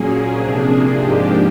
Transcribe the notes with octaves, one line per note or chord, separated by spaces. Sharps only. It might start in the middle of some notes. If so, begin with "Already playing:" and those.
Already playing: A#2 F#3 A#3 C#4 G#4
C3 F3 A#3 D4
G#2 F3 A#3 D4 G4